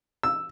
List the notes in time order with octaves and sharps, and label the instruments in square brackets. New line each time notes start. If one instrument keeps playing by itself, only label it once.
[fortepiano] E6